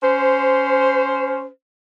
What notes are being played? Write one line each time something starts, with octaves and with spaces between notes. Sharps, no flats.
C#4 C5